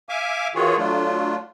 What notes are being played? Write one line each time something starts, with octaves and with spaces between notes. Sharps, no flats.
E5 F5 G#5 D6
D#3 E3 F4 F#4 G#4 C#5
F#3 A3 D4 F4